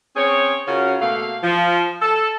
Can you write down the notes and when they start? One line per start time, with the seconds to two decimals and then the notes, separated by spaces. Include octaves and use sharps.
0.16 C4 C#4 G#4 C#5
0.68 C#3 C#4 F4 F#4 A#4
1.01 B2 A3 A#3 F5
1.44 F3
2.02 A4